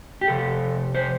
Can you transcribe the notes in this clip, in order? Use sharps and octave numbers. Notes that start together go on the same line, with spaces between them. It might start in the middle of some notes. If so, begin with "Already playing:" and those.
G4
F2 C3 A4
C5